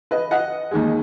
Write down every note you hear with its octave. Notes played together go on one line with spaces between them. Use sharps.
B4 D#5
D#5 F#5
D#2 D#3 G#3